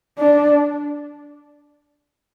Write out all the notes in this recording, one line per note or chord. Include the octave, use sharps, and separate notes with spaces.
D4